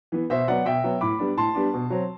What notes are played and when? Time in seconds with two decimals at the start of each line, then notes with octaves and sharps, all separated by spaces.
0.12 E3 B3
0.30 B2 C5 E5
0.48 F#3 B3 D5 F#5
0.65 B2 E5 G5
0.84 F#3 B3
1.01 A2 B5 D6
1.19 G3 B3 D4
1.37 A2 A5 C6
1.55 G3 B3 D4
1.74 B2
1.90 F#3 C4